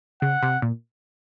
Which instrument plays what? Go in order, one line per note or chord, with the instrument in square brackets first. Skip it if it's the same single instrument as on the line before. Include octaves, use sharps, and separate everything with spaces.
[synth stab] C#3 [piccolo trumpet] F#5
[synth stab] C3
A#2